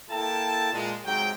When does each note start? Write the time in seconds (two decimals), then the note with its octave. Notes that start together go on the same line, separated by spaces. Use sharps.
0.11 A#3 E4 A4 G5 A5
0.73 A#2 G#3
1.05 G#2 C3 F#3 G#3 G5